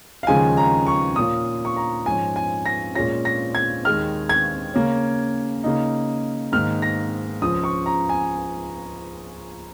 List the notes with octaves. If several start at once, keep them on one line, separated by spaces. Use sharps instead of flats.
F5
D#2 C#3 F3 G#3 D#4 G#5
A#5
C#6
A#2 A#3 C#4 F4 D#6
C#6
A#5
G#2 F3 C#4 G#5
G#5
A#6
A#2 G#3 C#4 F4 A#6
A#6
G#6
D#2 D#3 G#3 F6
G#6
C#3 A#3 C#4
C#3 A#3 D#4
G#2 D#3 A#3 D#4 F6
A#6
C#2 C#3 F3 D#6
C#6
A#5
G#5